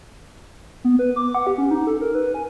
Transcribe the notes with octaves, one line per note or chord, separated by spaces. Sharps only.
B3
B4
D6
F#5
G4
C#4
D#4
A4
A#4
B4
G#5